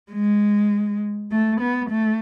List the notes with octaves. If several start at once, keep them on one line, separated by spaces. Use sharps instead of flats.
G#3
A3
B3
A3